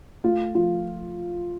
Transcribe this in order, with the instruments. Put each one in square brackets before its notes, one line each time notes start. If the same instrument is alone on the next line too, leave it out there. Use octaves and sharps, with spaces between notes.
[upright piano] A3 F4
F3 F4